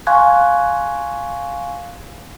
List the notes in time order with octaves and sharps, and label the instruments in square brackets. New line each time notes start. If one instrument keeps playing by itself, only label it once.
[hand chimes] F5 G#5 C6 C#6 F#6 G#6